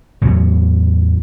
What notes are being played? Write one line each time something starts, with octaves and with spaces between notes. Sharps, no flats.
A1 E2 F#3